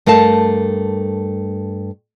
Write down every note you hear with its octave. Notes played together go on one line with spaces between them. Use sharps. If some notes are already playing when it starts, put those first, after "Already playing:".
G2 A3 A#4 F5 A5